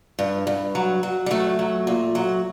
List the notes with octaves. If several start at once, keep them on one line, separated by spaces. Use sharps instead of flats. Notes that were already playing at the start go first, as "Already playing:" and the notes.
G2
G2
F#3
F#3
G3
F#3 A3
F#3
A#2
F#3